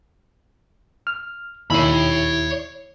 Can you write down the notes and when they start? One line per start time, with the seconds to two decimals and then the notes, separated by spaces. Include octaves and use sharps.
1.07 F6
1.70 D#2 E4 C#5 E5 B5